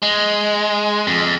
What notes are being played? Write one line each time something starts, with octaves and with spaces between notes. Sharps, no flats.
G#3
F2